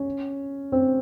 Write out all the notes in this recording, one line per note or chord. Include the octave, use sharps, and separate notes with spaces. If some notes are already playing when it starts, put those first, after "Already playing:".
Already playing: C#4
C4